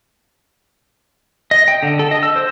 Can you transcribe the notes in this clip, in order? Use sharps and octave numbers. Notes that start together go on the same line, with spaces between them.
D#5
G5
D3
A4
D#5
E6
C5